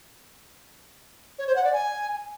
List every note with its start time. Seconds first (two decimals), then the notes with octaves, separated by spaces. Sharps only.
1.39 C#5
1.47 C5
1.56 F#5
1.64 D5
1.73 G#5